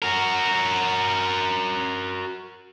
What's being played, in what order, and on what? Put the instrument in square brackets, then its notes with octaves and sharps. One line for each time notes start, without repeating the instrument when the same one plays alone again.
[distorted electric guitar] F#4 A#4